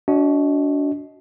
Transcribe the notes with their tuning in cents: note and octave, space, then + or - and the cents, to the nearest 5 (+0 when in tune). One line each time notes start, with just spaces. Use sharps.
D4 -30 F#4 +0 D#5 +20